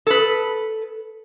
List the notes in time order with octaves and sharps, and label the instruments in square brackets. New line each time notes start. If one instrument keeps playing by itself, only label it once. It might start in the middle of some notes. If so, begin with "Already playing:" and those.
[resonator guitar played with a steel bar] A4 B4